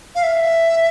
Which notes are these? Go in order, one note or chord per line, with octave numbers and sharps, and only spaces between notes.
F5
E5